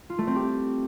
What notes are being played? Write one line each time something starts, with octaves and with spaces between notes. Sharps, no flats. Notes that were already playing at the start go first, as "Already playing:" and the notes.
F4
A3
C4
G4